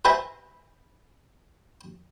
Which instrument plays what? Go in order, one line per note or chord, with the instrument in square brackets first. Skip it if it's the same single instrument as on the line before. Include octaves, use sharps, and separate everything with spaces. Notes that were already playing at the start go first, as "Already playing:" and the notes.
[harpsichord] B4 C5 E5 G#5 A#5 C6